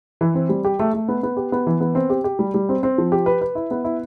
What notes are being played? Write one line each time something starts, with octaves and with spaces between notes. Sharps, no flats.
E3
C4
G3
G4
A3
A3
B3
B3
G4
B3
E3
B3
C4
G4
G4
G3
G3
C4
C4
F3
G4
B4
B4
E4
B3
E4